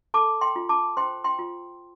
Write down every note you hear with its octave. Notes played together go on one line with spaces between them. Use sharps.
A4 A5 D6
G5 C6
F4
A5 D6
C5 G5 C6
G5 C6
F4